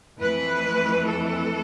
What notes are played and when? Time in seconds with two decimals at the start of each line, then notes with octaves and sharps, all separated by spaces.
0.20 F2 E3 A3 B4
1.06 A4